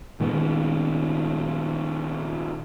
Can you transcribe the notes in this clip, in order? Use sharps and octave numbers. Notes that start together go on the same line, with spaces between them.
A#2 D#3 G#3 B3